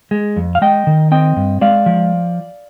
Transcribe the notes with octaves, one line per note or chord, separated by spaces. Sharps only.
G#3
F2
F5
G#3 D#5 G5
D#3
C4 D#5 G5
G2
G#3 D5 F5
F3